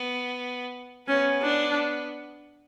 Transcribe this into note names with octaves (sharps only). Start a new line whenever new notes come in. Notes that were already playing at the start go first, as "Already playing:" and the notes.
Already playing: B3
B3 C#4
D4